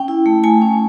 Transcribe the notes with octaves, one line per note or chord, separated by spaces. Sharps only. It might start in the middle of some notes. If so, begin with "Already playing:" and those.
Already playing: C#4 G5
E4
A3
A3 G#5
C#4